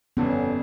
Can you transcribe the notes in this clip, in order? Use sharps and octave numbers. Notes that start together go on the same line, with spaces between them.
G1 F2 D3 B3 C#4